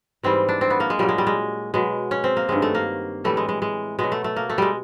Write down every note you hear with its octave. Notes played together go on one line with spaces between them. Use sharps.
G#2 E3 G3 C4
D4
C4
B3
A#3
G#3
A#2 F#3 G3
G#3
G3
G#3
B2 F#3 G#3
C#4
C4
A#3
G2 D#3 F#3 G#3
A3
A#3
A2 E3 G3 A3
G#3
G#3
G#3
B2 F#3 G#3
A3
A3
A#3
A3
G3 G#3